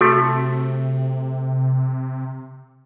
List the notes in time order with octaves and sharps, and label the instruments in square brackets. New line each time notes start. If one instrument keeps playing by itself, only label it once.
[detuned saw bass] C3 [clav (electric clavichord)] A3 [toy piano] F#4 A4 C#6